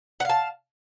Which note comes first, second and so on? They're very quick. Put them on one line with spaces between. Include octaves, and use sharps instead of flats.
F#5 F5 A5